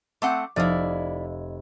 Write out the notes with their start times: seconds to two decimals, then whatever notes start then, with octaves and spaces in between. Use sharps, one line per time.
0.22 A3 C4 F#5 D6
0.56 F1 E4 D5 D#5 F5